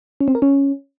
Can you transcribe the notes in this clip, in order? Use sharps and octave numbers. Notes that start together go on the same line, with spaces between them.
C#4
C4
A#4
C#4